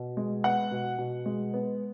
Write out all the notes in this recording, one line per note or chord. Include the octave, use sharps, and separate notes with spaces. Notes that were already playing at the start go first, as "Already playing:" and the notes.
Already playing: B2
G#3
B3 F#5
B2
B2
G#3
B3